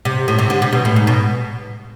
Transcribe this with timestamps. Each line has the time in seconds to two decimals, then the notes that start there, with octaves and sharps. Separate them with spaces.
0.05 C3
0.28 A2
0.39 C3
0.50 D3
0.62 C3
0.73 B2
0.85 A2
0.96 G#2
1.07 B2